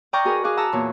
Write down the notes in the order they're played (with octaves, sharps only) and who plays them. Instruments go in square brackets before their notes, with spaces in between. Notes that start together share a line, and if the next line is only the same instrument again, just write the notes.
[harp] D5 D#5 G5 A#5 C#6 F6
F#4 G#4 A#4 B4 D#5
G#4 F5 D6 F#6
F#5 A5 A#5 E6
E2 A#2 B4 C#5